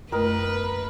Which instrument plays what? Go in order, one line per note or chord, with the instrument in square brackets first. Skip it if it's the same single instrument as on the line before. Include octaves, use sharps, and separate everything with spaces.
[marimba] F#2 A3 [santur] A#4 D#5 [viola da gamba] B4